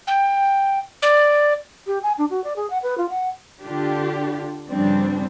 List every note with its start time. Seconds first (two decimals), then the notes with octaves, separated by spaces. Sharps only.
0.07 G5
1.02 D5
1.87 G4
2.03 G#5
2.18 D4
2.30 F#4
2.44 D5
2.56 G#4
2.70 F#5
2.83 B4
2.98 F4
3.09 F#5
3.62 D3 D4 F4 G4
4.68 G2 C#3 F3 G3 C4 D4